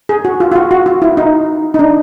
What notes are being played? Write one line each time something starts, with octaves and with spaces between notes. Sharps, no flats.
G#4
F#4
F4
F4
F#4
F#4
F4
E4
D#4
D#4
D4